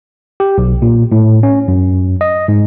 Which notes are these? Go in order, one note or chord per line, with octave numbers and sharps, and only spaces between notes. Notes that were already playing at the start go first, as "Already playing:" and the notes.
G4
B1
A#2
A2
C#4
F#2
D#5
G#2